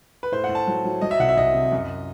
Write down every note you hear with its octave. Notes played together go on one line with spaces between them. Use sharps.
B4
A2 C5
F#5
A2
A5
F#3
F#3
F#3 D#5
E5
C2 F#5
E5
C2 D#5
C3
F#2